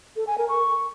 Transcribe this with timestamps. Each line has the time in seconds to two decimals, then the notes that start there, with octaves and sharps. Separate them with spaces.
0.16 A4
0.27 G#5
0.38 A#4
0.49 C#6